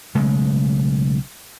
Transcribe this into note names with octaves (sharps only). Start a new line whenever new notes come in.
B1 C#3 G#3 A3